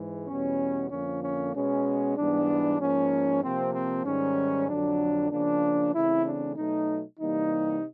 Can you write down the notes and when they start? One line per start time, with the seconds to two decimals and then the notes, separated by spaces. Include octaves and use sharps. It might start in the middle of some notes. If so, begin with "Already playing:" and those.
Already playing: G#2 E3 G#3
0.27 E2 B2 G3 B3 C#4
0.90 F2 D3 F3 A#3 C#4
1.23 C#4
1.54 B2 G#3 B3 C#4
2.17 G#2 E3 G3 B3 D4
2.80 G#2 F3 A#3 C#4
3.43 C3 F3 A#3 C4
3.74 C4
4.05 G#2 D#3 G3 C#4
4.69 F2 D3 F#3 D4
5.31 C#3 F3 A#3 D4
5.94 C#3 E3 A3 C4 E4
6.26 D4
6.57 B2 F#3 A3 D#4
7.20 C3 E3 G3 A#3 D#4